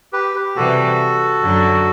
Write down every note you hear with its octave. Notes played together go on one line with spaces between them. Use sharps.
G4 B4
G4
C3 E3 G3 F#4 A4
F#2 D3 F#3